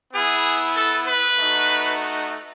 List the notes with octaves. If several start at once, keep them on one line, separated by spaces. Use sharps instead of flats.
B3 E4 G#4
A4
B4
A3 D#4 F#4